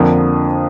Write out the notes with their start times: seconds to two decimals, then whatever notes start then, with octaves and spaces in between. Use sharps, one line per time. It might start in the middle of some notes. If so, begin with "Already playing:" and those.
Already playing: F2 D3 F3 A#3 D4